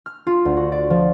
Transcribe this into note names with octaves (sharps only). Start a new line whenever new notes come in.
F6
F4
D2
F#4
D5
F3